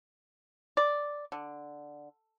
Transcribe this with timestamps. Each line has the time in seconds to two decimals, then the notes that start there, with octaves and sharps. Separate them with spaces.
0.77 D5
1.32 D3